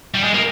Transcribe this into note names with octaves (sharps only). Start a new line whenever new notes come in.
G3
G#3
A#3